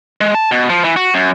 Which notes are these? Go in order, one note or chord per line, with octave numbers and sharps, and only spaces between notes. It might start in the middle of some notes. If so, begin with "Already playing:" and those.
G#3
A5
B2
F3
E3
F#4
F#2